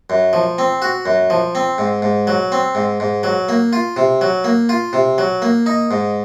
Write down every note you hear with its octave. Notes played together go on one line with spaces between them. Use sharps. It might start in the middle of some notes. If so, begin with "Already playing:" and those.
F#2
F3
C4
F#4
F#2
F3
C4
G#2
G#2
F#3
C4
G#2
G#2
F#3
A#3
F4
C3
F#3
A#3
F4
C3
F#3
A#3
D#4
G#2